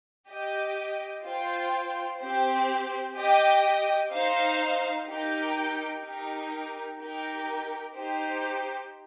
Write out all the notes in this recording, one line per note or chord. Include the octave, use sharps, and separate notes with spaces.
G4 D#5 G5
F4 C5 G5
C4 G4 C5
G4 D#5 G5
D#4 C5 F5
D#4 G4 A#4 G5
D#4 G4 A#4
D#4 G4 A#4 G5
D#4 G4 C5